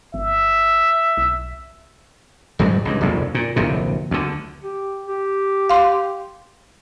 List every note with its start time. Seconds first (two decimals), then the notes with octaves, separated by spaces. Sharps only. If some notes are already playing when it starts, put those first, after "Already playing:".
0.14 G1 E5
1.17 B1
2.59 D#1 G#2 F#3 G3
2.85 C#2 G2
3.01 F1 A#1 D#2
3.35 A#2
3.56 D1 A#1 C3
4.11 D2 D3
4.63 G4
5.08 G4
5.69 F5 C6